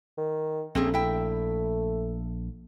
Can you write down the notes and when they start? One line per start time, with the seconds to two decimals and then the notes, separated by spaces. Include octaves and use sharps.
0.18 D#3
0.75 A#1 A3 C4 C#4 G#4
0.94 E4 G5